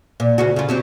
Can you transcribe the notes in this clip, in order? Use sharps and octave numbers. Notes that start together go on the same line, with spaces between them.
A#2
D2 C#3 F#4
C#3 F4
F#3 C4 G4